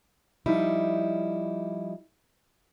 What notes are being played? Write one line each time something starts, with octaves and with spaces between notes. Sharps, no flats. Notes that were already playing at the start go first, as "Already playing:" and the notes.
F3 G3 D#4 E4